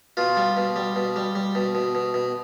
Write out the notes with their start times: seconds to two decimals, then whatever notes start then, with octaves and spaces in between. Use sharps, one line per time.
0.17 B2 F4
0.37 G3
0.57 B2
0.76 G3
0.96 B2
1.16 G3
1.35 G3
1.55 B2
1.75 B2
1.95 B2
2.14 B2